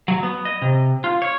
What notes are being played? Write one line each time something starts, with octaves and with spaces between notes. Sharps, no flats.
F#3
B3
D#5
C3
F4
C#5